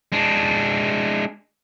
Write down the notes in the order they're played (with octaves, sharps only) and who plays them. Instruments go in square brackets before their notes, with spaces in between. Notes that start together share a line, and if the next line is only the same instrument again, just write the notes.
[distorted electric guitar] G#3 D4